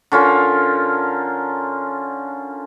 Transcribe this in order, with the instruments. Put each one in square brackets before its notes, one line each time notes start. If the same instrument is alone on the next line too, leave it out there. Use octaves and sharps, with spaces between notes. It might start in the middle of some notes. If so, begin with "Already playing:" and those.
[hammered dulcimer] D3 C#4 F4 A#4